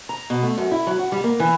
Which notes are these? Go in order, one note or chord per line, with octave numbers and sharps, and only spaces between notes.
A#5
B2
A3
F#2
E4
F#3
F#4
G3
A#3
E3